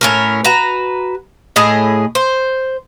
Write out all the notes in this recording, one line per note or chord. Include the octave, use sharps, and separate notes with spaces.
A2 C#4 A#4
F#4 B4 A#5
A2 G#4 D#5
C5